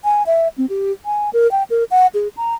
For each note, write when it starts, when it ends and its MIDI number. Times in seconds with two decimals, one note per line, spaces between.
0.04 0.23 80
0.27 0.48 76
0.58 0.66 60
0.70 0.92 67
1.06 1.30 80
1.33 1.50 70
1.52 1.63 79
1.70 1.84 70
1.91 2.07 78
2.14 2.28 68
2.37 2.55 82